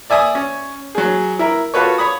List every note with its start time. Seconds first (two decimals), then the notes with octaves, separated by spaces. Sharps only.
0.10 D5 E5 G#5 D#6
0.35 C#4
0.95 F#3 G#4
1.39 E4 A#4
1.74 F4 F#4 A4 B4 C#5
1.98 C#5 B5 D#6